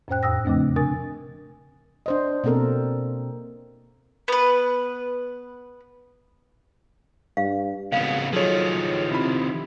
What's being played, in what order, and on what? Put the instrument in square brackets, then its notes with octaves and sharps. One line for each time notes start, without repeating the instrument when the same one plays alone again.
[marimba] F2 A2 C#4 C5 G5 F#6
E2 A2 G5 D#6 E6 A#6
C#3 F3 A3 C4 D4
C3 D4 A#4 G#5 D#6 A6
[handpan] D4 C5 D#5
B2 A#3 C4 A4 A#4
[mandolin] B3 B4
[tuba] G2 [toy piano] F5
[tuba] G#1 [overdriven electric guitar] C#3 B3 [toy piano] F5
[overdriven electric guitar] D#3 F3 [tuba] F#3 [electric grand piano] G#4 A4 C#5
[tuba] C3 [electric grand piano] E4 B5